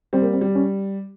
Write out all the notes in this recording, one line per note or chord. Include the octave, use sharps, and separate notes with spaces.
G3 C4
A#3
C4
G3
C#4